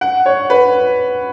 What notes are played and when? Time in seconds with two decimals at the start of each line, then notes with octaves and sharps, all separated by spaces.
0.01 F#5
0.26 C#5
0.50 B4